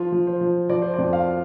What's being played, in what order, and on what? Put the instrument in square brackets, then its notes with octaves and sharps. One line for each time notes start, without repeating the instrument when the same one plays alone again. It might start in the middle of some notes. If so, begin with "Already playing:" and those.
Already playing: [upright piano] F3 F4
F3
C5
F3
F3 D5
C5
D5
F2
F5